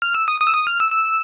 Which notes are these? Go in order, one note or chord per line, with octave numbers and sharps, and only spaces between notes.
F6
E6
D#6
D#6
E6
D#6
F6
E6
E6